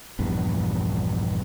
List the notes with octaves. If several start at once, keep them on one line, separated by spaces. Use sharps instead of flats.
A#1 E2 G2